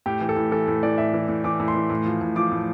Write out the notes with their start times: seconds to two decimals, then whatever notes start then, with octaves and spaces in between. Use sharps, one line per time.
0.06 A2 G4
0.21 E3
0.29 A4
0.36 A2
0.51 E3 A4
0.68 A2
0.83 E3 D5
0.98 A2 E5
1.14 E3
1.28 A2
1.44 E3 D6
1.60 A2
1.68 C6
1.75 E3
1.90 A2
2.06 F3
2.21 A2
2.36 F3 D6
2.52 A2